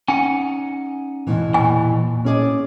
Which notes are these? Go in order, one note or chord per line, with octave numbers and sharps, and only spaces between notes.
C#4 D#4 F#5 G#5
E2 B2 E3
A#2 G#5
C#4 G#4 D5